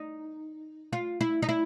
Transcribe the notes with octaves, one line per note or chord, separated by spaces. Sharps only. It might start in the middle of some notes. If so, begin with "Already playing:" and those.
Already playing: D#4
F4
E4
D#4
E4